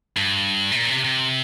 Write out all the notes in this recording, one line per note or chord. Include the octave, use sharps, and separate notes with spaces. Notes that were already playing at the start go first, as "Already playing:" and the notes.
G2
C3
A#2
C3
C3